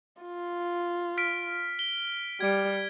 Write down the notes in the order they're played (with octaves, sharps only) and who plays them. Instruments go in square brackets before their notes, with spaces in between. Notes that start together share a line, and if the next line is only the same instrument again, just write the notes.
[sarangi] F4
[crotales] F6 B6 D7
G7
[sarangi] G3 [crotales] G#6 D7